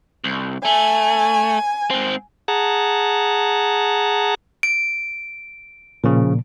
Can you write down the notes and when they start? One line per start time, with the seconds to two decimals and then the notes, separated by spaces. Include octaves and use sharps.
0.24 C2
0.65 A3 G#5
1.90 G#2 C4
2.48 G#4 F#5 A5 A#5
4.63 D7
6.04 A#2 C#3 F3